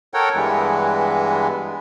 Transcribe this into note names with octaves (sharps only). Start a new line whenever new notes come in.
A4 A#4 C#5 F#5 G5
G2 E3 G#3 B3